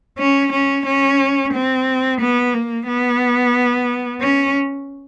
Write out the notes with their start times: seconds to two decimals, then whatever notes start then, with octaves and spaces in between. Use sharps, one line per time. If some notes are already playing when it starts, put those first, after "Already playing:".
0.18 C#4
0.52 C#4
0.85 C#4
1.53 C4
2.20 B3
2.54 A#3
2.88 B3
4.22 C#4